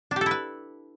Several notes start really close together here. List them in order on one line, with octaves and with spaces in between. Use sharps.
D4 G4 A4 E4 B4